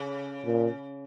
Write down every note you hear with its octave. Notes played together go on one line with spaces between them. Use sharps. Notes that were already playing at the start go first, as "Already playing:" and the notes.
Already playing: C#3
A#2